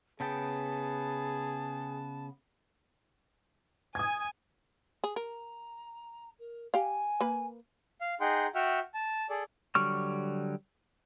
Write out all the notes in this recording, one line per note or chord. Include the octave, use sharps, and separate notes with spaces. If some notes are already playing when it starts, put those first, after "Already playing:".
C#3 B3 G#4 G5 A5
G#5 D#6 G#6
G#4
A#4 A#5
A#4
G4 F5 G#5
A#3 B4
F5
D#4 G#4 F#5 G5 C6
F#4 E5 F#5 G5 F6
A5
G#4 A4 D5
D3 F#3 G3 C#6 F6